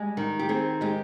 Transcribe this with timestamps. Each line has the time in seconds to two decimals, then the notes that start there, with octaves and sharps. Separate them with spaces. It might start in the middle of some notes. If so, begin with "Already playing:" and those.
Already playing: G3 G#3
0.17 D#3
0.39 G4
0.49 C4 G#4
0.81 G#3 G4